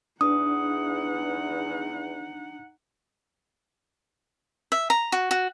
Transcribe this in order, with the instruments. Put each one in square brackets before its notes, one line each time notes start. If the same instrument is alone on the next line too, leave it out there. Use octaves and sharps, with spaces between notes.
[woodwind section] E2 [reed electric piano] D4 [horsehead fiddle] D#4 F#5 [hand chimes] D#6
[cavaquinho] E5
A#5
F#4
F#4